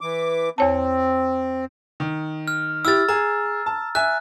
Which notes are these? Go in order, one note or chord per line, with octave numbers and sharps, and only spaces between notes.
E3 D6
E2 C4 C#5 A5
D#3
F6
E4 G4 E6 F6 A6
G#4 A#5
A5
E5 G#5 F#6